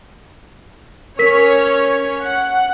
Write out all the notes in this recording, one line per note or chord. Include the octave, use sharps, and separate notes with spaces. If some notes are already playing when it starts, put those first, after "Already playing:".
C#4 A#4 C#5 B6
F#5